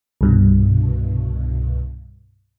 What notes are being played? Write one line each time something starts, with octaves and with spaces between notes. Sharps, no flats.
C2 G2 B2